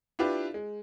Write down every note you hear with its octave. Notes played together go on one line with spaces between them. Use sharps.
D4 E4 F4 G4 B4
G#3